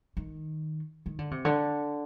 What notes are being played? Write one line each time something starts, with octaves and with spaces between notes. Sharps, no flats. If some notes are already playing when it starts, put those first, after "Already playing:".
D#3
D#3
D3
C3
D3